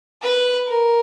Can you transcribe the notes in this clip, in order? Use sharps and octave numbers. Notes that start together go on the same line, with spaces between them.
B4
A#4